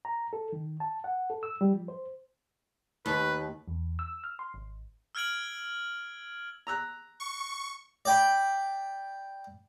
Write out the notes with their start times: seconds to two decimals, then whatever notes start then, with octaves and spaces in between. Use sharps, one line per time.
0.05 A#5
0.33 A4
0.53 D#3
0.80 A5
1.04 F#5
1.30 A4
1.43 E6
1.61 G3
1.73 F3
1.88 C5
3.06 D#2 B4
3.68 E2
3.99 E6
4.24 F6
4.39 C6
4.54 G#1
5.15 E6 F6 G#6 D7 F#7
6.67 A#5 E6 F#6
7.20 C#6
8.05 D5 G5 B5